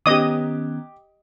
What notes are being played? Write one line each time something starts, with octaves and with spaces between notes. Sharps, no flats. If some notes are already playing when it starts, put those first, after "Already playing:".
D#3 B3 C#4 G4 D#5 D6 D#6